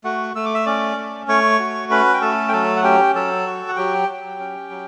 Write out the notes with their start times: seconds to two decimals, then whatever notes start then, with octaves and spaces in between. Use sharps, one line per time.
0.04 A3 F#4 F#5
0.35 A3 E6
0.46 D6
0.54 E5 E6
0.66 C#4 D5 D6
0.97 A3
1.28 A3 C#5 C#6
1.59 F#4
1.91 C#4 B4 B5
2.14 G5
2.21 A3 A4 A5
2.48 G5
2.52 F#3 A4 A5
2.77 F#5
2.83 C#4 G4 G5
3.15 F#3 A4 A5
3.46 F#4
3.68 F#5
3.76 F#3 G4 G5
4.08 F#3
4.40 C#4
4.70 F#3